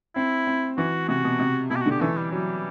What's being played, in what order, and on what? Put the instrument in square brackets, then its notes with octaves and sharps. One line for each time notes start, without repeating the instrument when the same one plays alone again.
[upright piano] C4 [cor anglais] E4
[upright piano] C4
[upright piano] E3 [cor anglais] F#4
[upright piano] C3 [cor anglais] F#4
[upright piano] B2
C3
[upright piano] B2 [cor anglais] E4
[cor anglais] G4
F#4
[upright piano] D3 [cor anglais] G4
[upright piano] E3 [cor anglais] A3
[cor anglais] G3
[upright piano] F#3 [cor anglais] G3